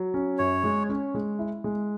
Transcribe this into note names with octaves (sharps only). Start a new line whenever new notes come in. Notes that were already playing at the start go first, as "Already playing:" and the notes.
Already playing: F#3
C#4
F#2 C#5
G#3
C#4
G#3
E4
G#3